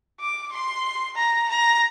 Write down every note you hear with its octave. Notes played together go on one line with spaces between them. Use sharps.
D6
C6
A#5
A#5